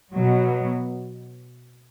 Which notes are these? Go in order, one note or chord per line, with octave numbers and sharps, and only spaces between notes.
B2 F#3